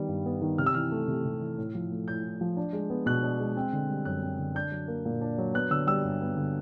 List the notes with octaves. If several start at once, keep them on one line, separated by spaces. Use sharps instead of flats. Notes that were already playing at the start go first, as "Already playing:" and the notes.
Already playing: D#3 G3 B3
G2
B3
D#3
C3 F6
E6
E3 F6
A3
C3
C3
E3
A2
F3
A3
A2 G6
A2
F3
D4
G#3
B3
B2 F#6
D4
G#3
C4
D3
G3
F#2 F#6
C4
D3
D4 G6
F#3
A#3
A#2
D4
F#3
B3 F#6
D3 E6
G3 E6
G2
B3
D3